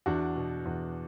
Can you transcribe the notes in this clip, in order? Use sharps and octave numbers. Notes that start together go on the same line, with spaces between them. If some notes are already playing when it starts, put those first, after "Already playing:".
E2 D4 F#4
B2
E2